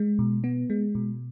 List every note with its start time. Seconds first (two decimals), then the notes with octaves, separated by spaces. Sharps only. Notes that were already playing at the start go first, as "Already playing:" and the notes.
Already playing: G#3
0.19 B2
0.44 B3
0.70 G#3
0.95 B2